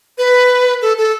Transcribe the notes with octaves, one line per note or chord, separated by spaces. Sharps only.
B4
A4
A4